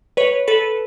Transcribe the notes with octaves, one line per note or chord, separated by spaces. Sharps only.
B4 C#5
A4 B4